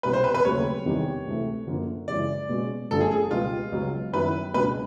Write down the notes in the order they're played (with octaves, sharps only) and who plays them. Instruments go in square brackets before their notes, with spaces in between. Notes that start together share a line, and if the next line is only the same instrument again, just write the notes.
[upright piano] C2 B2 G3 B3 [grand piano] B4
[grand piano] C5
B4
B4
[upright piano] D#2 C#3 F#3 A3 C4 [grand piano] C#5
[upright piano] E2 C3 D#3 G3
D2 C3 E3 A3
F#2 D3 F3 A#3
[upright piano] F#2 C#3 E3 G#3 [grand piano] D5
[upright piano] B2 G#3 C#4 F#4
[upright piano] G1 F#2 D3 F3 A3 [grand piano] A4
[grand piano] G#4
G#4
[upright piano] C#2 B2 G3 B3 [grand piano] F4
[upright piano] C#2 C#3 F#3 B3
[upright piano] F#2 D#3 F#3 B3 E4 [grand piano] B4
[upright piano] C#2 B2 F#3 B3 D4 [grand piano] B4